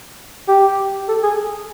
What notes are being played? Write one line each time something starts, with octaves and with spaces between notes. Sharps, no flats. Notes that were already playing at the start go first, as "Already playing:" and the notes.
G4
A4
G#4